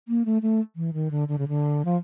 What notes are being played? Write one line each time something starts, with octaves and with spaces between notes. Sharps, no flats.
A#3
A3
A3
E3
D#3
D3
D3
C#3
D3
F3